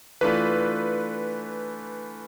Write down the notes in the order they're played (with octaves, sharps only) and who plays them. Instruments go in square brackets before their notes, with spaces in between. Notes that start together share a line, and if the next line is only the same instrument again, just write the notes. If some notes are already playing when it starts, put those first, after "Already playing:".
[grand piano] E3 A3 D4 F4 [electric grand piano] B4